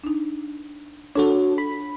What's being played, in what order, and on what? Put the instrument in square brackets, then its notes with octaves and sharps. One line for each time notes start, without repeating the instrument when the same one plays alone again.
[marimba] D4 D#4
[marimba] D4 F4 [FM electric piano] F#4 A4 C#5
[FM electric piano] B5